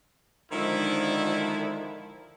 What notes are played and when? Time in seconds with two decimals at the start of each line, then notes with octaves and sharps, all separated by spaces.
0.52 D3 D#3 F3 G#3 E4